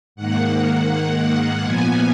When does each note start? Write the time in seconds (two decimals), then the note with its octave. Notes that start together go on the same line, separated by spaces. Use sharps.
0.15 G#2 D#3 A#3 F#5
0.89 F#5
1.26 F#5
1.62 A#2 F3 B3 G#5